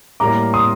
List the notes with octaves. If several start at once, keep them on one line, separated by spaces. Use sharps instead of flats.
A2 G3 A#3 A#5 D6
C6 D#6